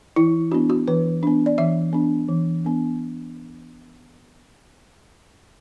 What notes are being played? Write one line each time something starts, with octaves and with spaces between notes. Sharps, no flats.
E3 E4
B3 D4 F#4
F#4
E3 B4
B3 D4
D5
E3 E5
B3 D4
E3
B3 D4